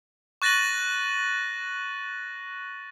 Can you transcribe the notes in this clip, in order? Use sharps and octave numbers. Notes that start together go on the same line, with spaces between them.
C#6 F#6 A6 A#6 D#7 F#7